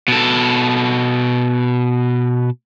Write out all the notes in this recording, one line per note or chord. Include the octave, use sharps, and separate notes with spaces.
B2 A4